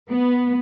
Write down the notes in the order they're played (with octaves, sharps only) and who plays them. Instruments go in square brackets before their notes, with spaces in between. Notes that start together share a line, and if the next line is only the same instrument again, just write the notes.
[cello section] B3